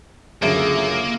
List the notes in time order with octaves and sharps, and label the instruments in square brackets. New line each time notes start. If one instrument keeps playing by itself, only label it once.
[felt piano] C#2 D3 [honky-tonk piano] F#2 E5 D7 [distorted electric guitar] A#3 [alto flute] G#4